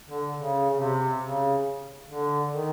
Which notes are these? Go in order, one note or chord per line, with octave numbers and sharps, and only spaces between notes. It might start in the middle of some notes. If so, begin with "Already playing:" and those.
D3
C#3
C#3
C3
C#3
D3
D#3